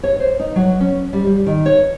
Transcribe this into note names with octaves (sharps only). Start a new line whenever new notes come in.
C#5
C5
D#4
F#3
C#4
G3
G3
D#3
C#5